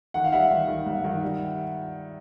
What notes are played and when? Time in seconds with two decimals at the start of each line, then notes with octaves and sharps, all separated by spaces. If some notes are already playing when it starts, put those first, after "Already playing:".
0.14 D#3 F#5
0.24 F5
0.32 G3 E5 F#5
0.50 D#3
0.68 D#3
0.86 G2
1.04 D#3
1.23 G3